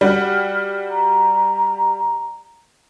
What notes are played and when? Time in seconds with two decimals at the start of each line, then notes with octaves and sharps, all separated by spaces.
0.01 G3 F#4 F6
0.90 A#5